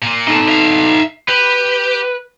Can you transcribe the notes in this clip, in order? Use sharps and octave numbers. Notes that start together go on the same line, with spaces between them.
A#2 A#3
D#4 A4 A5
E5 F5
G4 B4